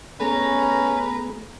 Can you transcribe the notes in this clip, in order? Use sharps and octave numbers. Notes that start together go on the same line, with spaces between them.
A3 B3 C#4 G#4 B4 A#5